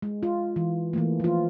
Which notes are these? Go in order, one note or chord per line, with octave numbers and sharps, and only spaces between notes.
G#3
F4
E3
E3 A3 A#3
F3 F4